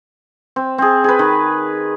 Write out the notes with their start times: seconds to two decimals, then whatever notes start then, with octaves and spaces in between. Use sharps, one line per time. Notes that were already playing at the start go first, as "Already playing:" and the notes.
0.56 C4
0.78 C4 G#4
1.04 G#4 B4
1.19 D#3